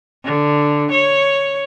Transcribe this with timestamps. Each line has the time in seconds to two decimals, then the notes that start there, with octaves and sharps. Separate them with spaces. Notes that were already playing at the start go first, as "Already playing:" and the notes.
0.25 D3
0.91 C#5